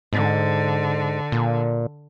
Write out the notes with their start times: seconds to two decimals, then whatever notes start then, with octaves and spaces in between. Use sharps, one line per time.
0.13 G#2 D3
1.32 A#2